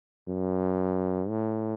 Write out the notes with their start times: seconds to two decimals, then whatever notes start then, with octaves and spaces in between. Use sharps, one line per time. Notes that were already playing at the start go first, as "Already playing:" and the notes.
0.27 F#2
1.29 A2